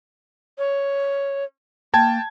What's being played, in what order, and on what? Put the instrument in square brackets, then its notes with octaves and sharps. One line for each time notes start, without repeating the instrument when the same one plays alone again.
[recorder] C#5
[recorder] A#3 [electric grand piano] G5 A5 G#6